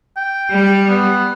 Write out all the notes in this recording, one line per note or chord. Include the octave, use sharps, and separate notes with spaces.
G5
G3
B3